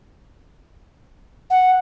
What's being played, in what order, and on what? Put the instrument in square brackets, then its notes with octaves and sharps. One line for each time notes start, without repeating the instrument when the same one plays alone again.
[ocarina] F#5